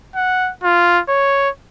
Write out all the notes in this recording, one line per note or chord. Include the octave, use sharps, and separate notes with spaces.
F#5
F4
C#5